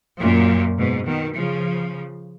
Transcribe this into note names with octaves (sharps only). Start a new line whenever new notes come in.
F#2 A#2
G#2 B2
B2 D#3
C#3 F3